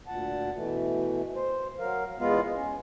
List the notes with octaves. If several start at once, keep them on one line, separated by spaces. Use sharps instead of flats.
D2 A#2 F#5 A5
B2 E3 A3
C5
F#3 A#4 F5
E2 G#3 B3 F4 F5
C#4